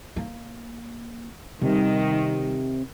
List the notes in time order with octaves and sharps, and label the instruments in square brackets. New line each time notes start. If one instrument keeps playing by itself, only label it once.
[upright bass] A#3
[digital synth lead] C3 [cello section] D#3 [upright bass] G3